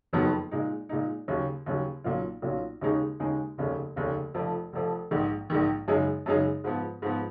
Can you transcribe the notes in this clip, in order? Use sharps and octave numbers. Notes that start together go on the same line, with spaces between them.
F#1 F2 D#3 F#3 B3
A#2 G#3 D#4
A#2 G#3 D#4
D#2 C#3 F#3
D#2 C#3 F#3
B1 A#2 F#3 C#4 F4
B1 A#2 F#3 C#4 F4
D#2 C#3 G#3 D#4 G#4
D#2 C#3 G#3 D#4 G#4
F1 D#2 C#3
F1 D#2 C#3
F1 F2 F3
F1 F2 F3
A#1 G#2 D#3
A#1 G#2 D#3
F#2 C#3 G#3 D#4 G#4
F#2 C#3 G#3 D#4 G#4
G#2 F3 B3
G#2 F3 B3